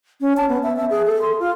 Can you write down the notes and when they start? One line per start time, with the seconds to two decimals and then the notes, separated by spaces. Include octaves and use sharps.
0.21 C#4
0.37 A5
0.49 B3
0.63 E5
0.76 E5
0.90 G#4
1.06 A4
1.22 C6
1.39 F4